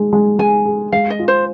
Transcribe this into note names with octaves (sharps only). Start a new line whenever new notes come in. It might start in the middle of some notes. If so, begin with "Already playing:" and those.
Already playing: G#3
G#3
G#3 G#5
G#4
G#3 F5
D#5
F4
C5